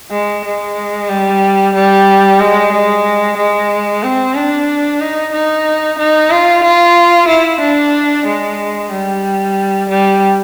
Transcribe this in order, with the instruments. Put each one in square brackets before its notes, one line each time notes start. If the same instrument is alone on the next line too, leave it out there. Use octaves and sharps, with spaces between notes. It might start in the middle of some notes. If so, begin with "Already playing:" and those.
[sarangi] G#3
G#3
G3
G3
G#3
G#3
G#3
C4
D4
D#4
D#4
D#4
F4
F4
E4
D4
G#3
G3
G3